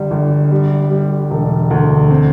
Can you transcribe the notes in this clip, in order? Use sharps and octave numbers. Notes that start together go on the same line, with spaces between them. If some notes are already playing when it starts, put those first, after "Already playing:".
Already playing: G1 G3
G1
G3
G3
E1
D2
C4